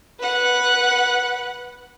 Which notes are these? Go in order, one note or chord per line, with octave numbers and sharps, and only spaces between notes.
B4 F#5